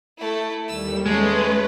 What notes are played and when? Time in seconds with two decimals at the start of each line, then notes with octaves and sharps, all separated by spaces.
0.18 A3 E4
0.68 D#2 G3 E6
1.06 G#3 A3 C#4 B4